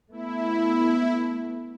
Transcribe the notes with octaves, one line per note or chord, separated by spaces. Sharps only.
A3 B3 E4